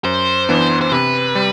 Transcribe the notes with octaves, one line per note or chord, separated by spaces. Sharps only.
F#2 C5
E3 B3 D4
C5
C3 B4
G3